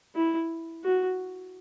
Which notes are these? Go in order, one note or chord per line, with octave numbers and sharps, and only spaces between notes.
E4
F#4